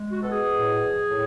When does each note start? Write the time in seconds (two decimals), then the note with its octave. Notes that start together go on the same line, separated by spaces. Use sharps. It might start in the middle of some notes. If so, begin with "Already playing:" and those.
Already playing: G#3
0.09 F#4
0.22 B2 A4
0.30 G#4
0.53 A2
0.82 F3
1.11 A2